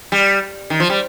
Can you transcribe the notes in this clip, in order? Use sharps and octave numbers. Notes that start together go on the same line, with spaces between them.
G3
D#3
F3
G3